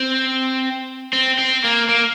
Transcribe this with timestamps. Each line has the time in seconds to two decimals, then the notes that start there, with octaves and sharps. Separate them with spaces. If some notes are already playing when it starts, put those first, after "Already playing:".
Already playing: C4
1.13 C4
1.38 C4
1.64 A#3
1.89 A#3